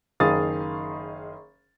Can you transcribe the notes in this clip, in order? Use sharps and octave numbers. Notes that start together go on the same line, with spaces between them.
F#1 D#3 G#4 F5 D#6 A6